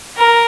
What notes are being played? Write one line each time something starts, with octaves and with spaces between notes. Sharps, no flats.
A#4